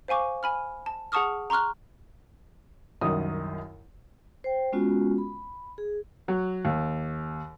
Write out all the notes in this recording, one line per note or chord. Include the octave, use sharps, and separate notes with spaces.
C5 F5 G#5 C#6 D6
G#5 B5 F6
A5
G#4 F#5 A5 C#6 D#6 F6
A#5 C6 C#6 F6 F#6
C2 F#2 D#3 D#6
C5 G5
G#3 B3 C#4 F4 F#4
B5
G#4
F#3
D#2